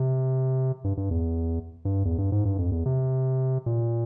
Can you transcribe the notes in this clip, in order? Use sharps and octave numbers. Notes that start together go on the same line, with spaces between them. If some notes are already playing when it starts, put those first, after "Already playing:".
Already playing: C3
G2
G2
E2
G2
E2
G2
G#2
G2
F2
E2
C3
A#2